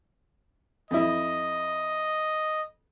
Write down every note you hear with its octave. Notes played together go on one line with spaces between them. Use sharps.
F2 E4 D#5